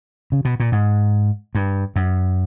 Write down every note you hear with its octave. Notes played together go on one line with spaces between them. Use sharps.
C#3
B2
A#2
G#2
G2
F#2